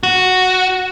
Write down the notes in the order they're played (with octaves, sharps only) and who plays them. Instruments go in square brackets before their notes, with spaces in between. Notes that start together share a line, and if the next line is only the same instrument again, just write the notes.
[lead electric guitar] F#4